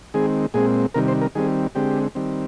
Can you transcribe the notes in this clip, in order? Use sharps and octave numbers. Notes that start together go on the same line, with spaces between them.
D#3 G#3 C4 G#4
A#2 G#3 C4 G#4
C3 D#3 G3 A#4
C5
A#4
D#3 G3 C4 G#4
D3 G#3 C4 G4
D#3 G3 C4